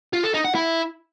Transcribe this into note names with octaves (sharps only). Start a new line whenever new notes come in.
F4
A4
D#4
F#5
E4